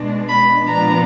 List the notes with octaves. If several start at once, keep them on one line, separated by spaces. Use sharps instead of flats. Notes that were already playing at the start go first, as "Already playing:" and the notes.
Already playing: B2 G#3 D4
B5
A#2 F3 B3 D4 A#5